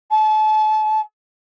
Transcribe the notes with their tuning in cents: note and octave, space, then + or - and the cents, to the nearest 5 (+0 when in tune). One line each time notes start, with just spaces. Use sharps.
A5 -35